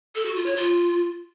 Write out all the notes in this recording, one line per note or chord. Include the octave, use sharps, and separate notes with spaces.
A4
F#4
F4
C#5
F4